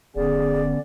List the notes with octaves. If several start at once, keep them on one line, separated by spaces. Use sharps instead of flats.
D#1 D3 B3 C#4 G#4 D5